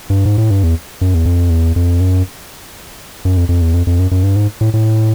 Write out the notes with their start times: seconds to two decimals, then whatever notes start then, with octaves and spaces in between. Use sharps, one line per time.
0.10 G2
0.25 G#2
0.38 A2
0.51 G2
0.63 E2
1.01 F#2
1.14 E2
1.25 F2
1.50 E2
1.76 F2
2.00 F#2
3.25 F#2
3.37 F2
3.49 F2
3.62 E2
3.74 F2
3.87 F2
3.99 F#2
4.11 F#2
4.23 G2
4.36 G#2
4.61 A2
4.74 A2